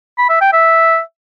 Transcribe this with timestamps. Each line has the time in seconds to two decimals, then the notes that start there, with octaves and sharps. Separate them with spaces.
0.18 B5
0.29 E5
0.41 G5
0.53 E5